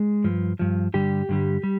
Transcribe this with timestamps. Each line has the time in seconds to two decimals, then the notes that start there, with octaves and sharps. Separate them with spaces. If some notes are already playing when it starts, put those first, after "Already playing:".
Already playing: G#3
0.24 G2 F3
0.59 G2 F3
0.94 G2 D3 G3 G4
1.29 G2 D3 G3
1.63 G3